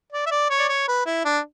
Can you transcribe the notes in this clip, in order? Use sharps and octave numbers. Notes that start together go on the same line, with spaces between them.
D5
E5
D5
C#5
D5
C#5
B4
E4
D4